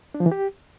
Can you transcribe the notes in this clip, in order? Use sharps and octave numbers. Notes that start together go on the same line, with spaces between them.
D4
F3
E3
G4